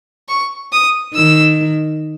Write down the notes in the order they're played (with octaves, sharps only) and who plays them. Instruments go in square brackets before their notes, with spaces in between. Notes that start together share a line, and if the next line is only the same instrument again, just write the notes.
[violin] C#6
D#6
[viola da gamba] D#3 [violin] E6